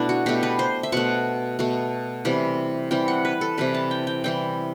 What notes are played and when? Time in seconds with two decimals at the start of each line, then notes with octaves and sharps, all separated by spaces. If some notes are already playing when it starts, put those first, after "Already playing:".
Already playing: B2 A3 D4 E4
0.09 F#4
0.26 B2 A3 G4
0.43 B4
0.59 C5
0.83 E5
0.92 B2 A3 F#5
1.59 B2 A3
2.25 C3 E3 G3
2.91 C3 E3 G3 G5
3.08 F#5
3.25 B4
3.41 A4
3.58 C3 E3 G3 B4
3.74 A5
3.91 G5
4.07 G5
4.24 C3 E3 G3 G5